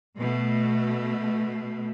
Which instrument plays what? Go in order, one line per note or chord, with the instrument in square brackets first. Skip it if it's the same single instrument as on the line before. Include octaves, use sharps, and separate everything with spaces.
[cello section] B2 A3